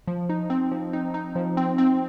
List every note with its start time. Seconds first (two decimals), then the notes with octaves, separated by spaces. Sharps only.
0.07 F3
0.29 D#4
0.50 C4
0.72 F3
0.93 D#4
1.14 D#4
1.35 F3
1.57 C4
1.78 C4